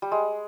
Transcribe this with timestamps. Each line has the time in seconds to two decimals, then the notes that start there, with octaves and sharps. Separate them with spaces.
0.02 G3
0.12 G#3